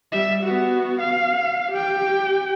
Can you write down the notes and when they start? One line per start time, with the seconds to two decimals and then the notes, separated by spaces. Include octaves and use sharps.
0.12 G3 E5
0.44 B3 F#4
1.00 F5
1.72 G4 G5